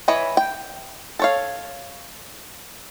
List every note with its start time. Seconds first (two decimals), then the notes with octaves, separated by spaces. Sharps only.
0.08 E3 E4 B4 C#5 D#5
0.37 G5
1.19 A4 C#5 F5